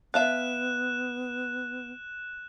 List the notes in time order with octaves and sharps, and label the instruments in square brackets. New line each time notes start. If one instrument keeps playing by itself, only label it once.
[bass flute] B3 [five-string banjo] E5 F5 A5 [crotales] F#6 E7